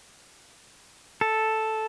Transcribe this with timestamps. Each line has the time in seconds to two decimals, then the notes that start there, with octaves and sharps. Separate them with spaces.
1.21 A4